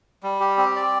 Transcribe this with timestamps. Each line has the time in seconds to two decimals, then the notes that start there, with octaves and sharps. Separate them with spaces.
0.23 G3
0.40 G4
0.57 C4
0.76 D5